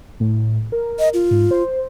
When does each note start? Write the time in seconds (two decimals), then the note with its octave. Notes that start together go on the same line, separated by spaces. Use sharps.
0.20 A2
0.72 A#4
0.99 D#5
1.14 F4
1.31 G#2
1.51 C5